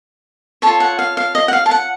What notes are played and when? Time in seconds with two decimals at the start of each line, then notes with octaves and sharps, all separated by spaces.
0.62 F4 A4 C#5 A5
0.80 F#5
0.99 F5
1.17 F5
1.35 D#5
1.48 F#5
1.53 F5
1.66 A5
1.71 F#5